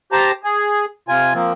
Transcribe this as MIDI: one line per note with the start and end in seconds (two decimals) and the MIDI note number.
0.12 0.31 67
0.12 0.31 72
0.12 0.31 81
0.12 0.31 82
0.44 0.85 68
1.08 1.33 48
1.08 1.33 65
1.08 1.33 80
1.34 1.53 53
1.34 1.53 58
1.34 1.53 60